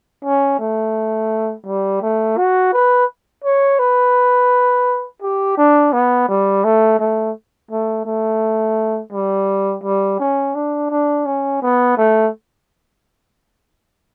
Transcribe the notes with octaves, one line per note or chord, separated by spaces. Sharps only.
C#4
A3
G3
A3
F#4
B4
C#5
B4
G4
D4
B3
G3
A3
A3
A3
A3
G3
G3
C#4
D4
D4
C#4
B3
A3